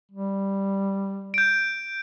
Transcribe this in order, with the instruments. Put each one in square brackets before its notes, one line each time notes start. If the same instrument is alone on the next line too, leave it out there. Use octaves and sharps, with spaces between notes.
[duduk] G3
[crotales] G6 D7